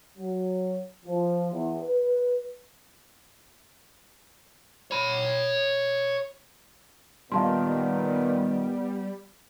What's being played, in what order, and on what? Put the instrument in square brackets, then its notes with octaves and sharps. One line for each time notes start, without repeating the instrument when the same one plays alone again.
[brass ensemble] F#3
F3
E2
B4
[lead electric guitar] C#5 B5
[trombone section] A#2 D#3 [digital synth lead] G3 [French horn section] B3 [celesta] F5 A5 C6